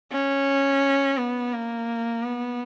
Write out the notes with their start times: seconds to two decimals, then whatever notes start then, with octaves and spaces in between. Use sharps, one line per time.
0.12 C#4
1.18 B3
1.53 A#3
2.23 B3